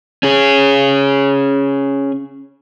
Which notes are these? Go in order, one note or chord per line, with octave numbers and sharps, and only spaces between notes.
C#4 G#4